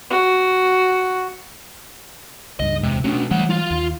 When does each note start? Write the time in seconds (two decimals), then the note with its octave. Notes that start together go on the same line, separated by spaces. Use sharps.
0.10 F#4
2.60 C#2 G2 D#5
2.83 D1 E2 C3 G#3
3.04 B2 F#3 A3 C#4 D4
3.31 E3 F#3 G3 A3 F#5
3.50 F4 F5
3.71 D#2